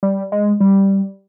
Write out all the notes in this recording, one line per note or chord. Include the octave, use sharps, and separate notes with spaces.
G3
G#3
G3